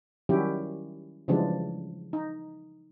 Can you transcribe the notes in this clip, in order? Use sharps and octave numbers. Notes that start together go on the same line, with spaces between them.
D#3 F#3 G3 C#4 E4 G4
C#3 E3 F3 G3 G#3 D4
D#4